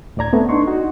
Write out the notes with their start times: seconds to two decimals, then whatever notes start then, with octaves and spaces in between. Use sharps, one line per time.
0.17 D2 A2 D5 A#5 G#6
0.33 A3 B3 C4
0.49 D4 D#4 C6 C#6
0.67 D#4 F#4